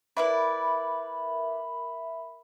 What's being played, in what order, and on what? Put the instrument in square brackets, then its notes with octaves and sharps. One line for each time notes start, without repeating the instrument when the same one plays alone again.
[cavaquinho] E4 B4 D5 [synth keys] A#4 E5 B5